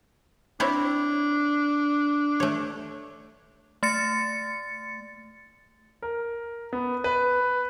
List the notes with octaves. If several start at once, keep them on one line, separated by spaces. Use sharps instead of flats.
C4 D4 E4 C#5
A3 C#5
A3 A6 C#7
A#4
B3
B4